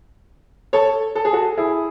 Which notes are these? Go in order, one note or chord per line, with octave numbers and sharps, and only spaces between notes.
A4 C#5
A4
G#4
F#4 A4
E4 G#4